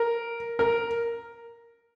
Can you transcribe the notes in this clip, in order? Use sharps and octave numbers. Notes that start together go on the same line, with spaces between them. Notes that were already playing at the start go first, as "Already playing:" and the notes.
Already playing: A#4
A#4